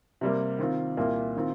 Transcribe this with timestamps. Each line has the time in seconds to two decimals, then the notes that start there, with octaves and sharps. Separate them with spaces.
0.21 C3 G3 A#3
0.59 D#3 C4 F4
0.97 C2 A#2 A#3 F4
1.37 D#3 C4 F4